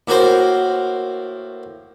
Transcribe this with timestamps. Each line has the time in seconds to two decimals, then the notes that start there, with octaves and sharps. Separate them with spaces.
0.08 A2 A#3 F#4 A#4 C5